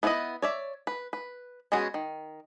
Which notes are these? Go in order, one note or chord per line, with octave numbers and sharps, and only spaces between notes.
B3 E4 B4 C#5 D#5
C#5 D5 E5
B4
B4
G#3 B3 C#4 F#4 G#4
D#3